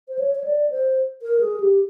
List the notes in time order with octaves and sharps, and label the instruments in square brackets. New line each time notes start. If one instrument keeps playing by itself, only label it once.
[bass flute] C5
C#5
C#5
D5
C5
A#4
G#4
G4